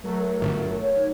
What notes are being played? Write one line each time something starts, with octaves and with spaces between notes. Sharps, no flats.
F#3 A3 A#4
G1
C#5
D#4